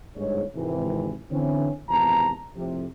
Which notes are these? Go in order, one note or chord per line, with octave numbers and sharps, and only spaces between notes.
G1 G#2 G#3 C#5
G#1 C#2 C3 E3
D3 E3 C4 C#4
G#1 E2 C3 A5 A#5
F2 A2 C3